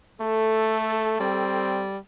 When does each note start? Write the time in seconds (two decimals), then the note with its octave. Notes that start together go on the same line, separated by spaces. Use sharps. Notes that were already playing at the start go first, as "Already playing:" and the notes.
0.21 A3 A4
1.20 G3 C4